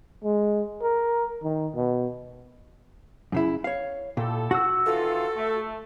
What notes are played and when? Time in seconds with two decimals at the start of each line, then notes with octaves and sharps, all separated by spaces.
0.24 G#3
0.83 A#4
1.44 D#3
1.75 B2
3.32 F#2 C#3 E4
3.64 C#5 F5
4.17 A#2 E4 G4 A4
4.51 F#4 F#5 E6
4.86 D#3 E3 F4 A4
5.36 A3